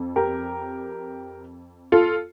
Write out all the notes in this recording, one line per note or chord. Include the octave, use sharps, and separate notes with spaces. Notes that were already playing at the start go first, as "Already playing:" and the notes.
Already playing: F2
G4 A#4
F4 A4